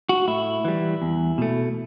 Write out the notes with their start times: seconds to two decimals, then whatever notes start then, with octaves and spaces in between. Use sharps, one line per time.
0.09 F#4
0.28 A2 E4
0.65 E3 G3
1.02 E2
1.38 B2 A3